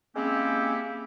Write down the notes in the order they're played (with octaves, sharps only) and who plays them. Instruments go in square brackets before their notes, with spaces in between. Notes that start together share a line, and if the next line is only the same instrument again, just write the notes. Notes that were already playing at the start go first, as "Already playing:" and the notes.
[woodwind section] G#3 A#3 C4 C#4 E4 G4